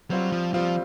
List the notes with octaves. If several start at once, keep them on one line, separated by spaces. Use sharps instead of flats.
F#3 G3 C4 F4
F3
F3 G3 C4 F4